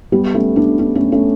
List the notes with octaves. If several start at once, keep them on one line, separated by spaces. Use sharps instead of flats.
G3 B3
A3 C#4
B3 D4
B3 D4
A3 C#4
A3 C#4